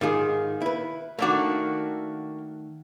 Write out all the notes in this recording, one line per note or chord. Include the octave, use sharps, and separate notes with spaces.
G#2 D#3 F4 G#4
E4 B4
D#3 A3 A#3 D4 F#4